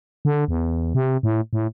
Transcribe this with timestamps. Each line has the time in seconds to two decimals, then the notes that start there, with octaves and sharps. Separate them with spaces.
0.25 D3
0.48 E2
0.95 C3
1.23 A2
1.53 A2